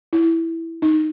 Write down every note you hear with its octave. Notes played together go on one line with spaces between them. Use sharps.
E4
D#4